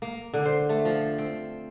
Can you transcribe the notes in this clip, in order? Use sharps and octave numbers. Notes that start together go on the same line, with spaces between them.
A#3
D3
C5
A3
F3
C4